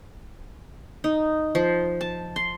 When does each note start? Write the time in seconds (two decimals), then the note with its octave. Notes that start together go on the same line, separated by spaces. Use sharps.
1.04 D#4
1.55 F3
2.01 A5
2.36 C6